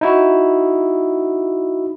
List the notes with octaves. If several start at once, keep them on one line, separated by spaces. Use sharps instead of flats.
D#4 E4 F#4